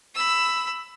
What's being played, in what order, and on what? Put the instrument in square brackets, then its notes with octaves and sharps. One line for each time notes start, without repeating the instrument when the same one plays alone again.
[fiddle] B5 E6